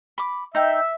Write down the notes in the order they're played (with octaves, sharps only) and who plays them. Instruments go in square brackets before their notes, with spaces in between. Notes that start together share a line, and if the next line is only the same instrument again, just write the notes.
[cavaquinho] B5 D6
[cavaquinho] D#4 G5 [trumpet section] E5